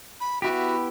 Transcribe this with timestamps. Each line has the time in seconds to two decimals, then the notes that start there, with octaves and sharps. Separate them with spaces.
0.20 B5
0.42 B3 E4 F#4 G4